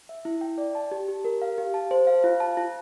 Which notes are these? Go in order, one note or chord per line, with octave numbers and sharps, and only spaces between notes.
E5
E4
G5
D5
A5
G4
G4
A#4
F5
G4
A5
C5
F5
F4
A5
F4